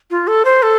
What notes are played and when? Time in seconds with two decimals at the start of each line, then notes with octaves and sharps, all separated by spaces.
0.11 F4
0.27 A4
0.45 C5
0.63 A4